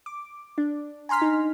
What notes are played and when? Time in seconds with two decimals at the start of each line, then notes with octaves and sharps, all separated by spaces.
0.06 D6
0.58 D4
1.09 G#5 A#5 C6 F6 B6
1.22 D#4